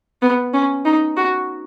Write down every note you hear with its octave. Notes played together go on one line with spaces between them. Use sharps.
B3
C#4
D#4
F#4